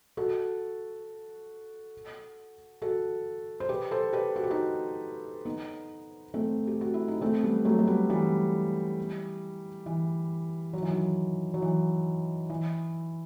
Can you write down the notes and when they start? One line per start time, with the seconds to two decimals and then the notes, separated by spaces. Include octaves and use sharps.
0.17 F#4 A4
2.82 F#4 A4
3.60 C5
3.69 G4 B4
3.91 A4 C5
4.13 G4 B4
4.36 F#4
4.43 G4
4.50 D#4 F#4
5.45 B3 D#4
6.34 A3 C4
6.67 G4
6.81 F#4
6.94 E4
7.08 D#4
7.21 A3 C4
7.43 G3 B3
7.65 F#3 A3
7.79 A3
7.87 G3 B3
8.09 E3 G3
9.86 E3
10.73 F#3
10.82 E3
10.90 D#3 F#3
11.54 F#3
11.62 E3
12.50 E3